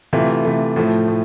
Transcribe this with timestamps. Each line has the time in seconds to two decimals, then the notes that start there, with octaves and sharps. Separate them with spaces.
0.13 C3 E3 A3 F4
0.45 C3 E3 A3
0.76 A2 F3 A3
1.08 A2